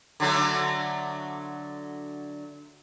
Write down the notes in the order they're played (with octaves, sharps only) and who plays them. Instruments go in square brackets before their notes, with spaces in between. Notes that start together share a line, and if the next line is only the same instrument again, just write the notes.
[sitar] D3 F#3 A3